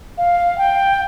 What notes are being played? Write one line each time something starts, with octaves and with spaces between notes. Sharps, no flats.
F5
G5